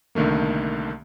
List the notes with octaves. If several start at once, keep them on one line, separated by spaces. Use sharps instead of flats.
C2 D3 D#3 A3 A#3